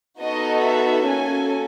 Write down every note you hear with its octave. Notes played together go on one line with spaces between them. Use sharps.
B3 D#4 F#4 A4 D#5
E5
A#3 C#4 F#4 A4 G#5